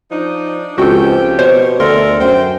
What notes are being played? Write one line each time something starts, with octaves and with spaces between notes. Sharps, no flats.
F3 D4 D#4
C#2 F3 C4 F#4 G4 A4 G5
B2 C5 C#5
D2 A4 A#4 C6
F#2 C5 G5